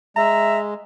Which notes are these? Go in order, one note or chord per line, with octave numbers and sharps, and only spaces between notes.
G#3 E5 A#5